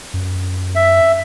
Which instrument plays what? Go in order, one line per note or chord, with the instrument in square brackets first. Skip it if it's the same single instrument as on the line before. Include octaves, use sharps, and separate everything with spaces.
[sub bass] F#2
[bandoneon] E5